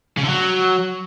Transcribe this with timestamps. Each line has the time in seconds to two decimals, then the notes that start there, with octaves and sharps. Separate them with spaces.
0.17 C#3
0.23 D3
0.29 F#3